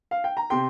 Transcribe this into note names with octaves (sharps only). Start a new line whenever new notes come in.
F5
G5
A#5
C3 G5 C6